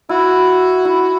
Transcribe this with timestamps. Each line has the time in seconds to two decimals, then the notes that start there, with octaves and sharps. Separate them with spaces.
0.09 E4 F#4
0.85 E4